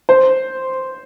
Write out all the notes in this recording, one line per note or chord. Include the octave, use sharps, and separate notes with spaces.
C5